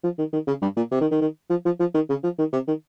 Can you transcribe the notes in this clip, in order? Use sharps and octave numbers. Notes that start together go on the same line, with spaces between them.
F3
D#3
D#3
C#3
G2
A#2
C3
D#3
D#3
D#3
F3
F3
F3
D#3
C#3
F3
D#3
C3
D#3